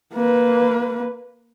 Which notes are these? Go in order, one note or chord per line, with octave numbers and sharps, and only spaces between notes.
A#3 B4